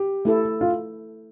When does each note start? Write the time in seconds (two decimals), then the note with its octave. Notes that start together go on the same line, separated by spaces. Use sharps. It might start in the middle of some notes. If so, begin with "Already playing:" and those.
Already playing: G4
0.25 A3 E4 A4
0.61 F4